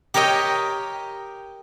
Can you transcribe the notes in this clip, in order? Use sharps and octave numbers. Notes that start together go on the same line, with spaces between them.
G4 A#4 C#5 D#5 G5